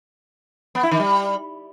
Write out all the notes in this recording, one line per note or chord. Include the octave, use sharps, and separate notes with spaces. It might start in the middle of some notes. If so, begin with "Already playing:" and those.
B3
E4
D#3
G3